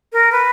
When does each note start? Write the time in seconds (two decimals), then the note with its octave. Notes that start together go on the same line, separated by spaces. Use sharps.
0.13 A#4
0.32 B4